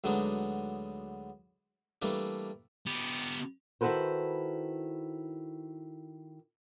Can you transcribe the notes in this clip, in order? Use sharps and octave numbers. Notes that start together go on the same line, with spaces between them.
D2 F#3 G#3 B3 D4 D#4
E3 G3 A3 A#3 D4
B3 G4
D#3 E4 F#4 A4 B4 C5